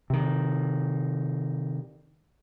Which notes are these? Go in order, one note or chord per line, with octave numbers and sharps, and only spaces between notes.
C3 D#3